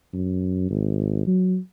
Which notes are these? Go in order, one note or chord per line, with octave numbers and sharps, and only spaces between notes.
F#2
G#1
F#3